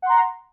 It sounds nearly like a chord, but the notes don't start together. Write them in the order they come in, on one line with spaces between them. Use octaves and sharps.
F#5 C6 A#5